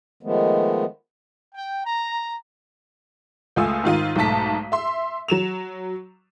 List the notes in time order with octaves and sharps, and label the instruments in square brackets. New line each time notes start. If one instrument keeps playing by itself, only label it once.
[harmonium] D#3 F3 G#3 A3 B3
[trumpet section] G5
A#5
[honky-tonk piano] C#2 A3 F4 G#5 D#6 E6
G#2 D#3 F4 D#7
B1 G#2 A3 A5 B6
E5 C6
F#3 E7 F7